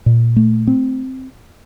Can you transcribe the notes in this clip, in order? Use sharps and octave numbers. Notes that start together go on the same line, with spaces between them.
A#2
A3
C4